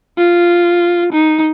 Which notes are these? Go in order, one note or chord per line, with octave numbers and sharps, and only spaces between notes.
F4
D#4